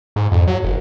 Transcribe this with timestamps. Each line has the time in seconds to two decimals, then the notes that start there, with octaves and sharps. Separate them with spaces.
0.16 G#2
0.32 F2
0.47 F#3
0.64 F#1